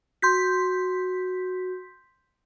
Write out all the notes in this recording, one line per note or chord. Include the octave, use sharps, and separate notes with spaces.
F#4 C6 G6 B6